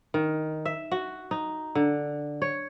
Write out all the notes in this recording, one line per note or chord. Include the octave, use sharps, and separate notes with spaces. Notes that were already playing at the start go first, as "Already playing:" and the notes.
D#3
E5
F#4
D#4
D3
C#5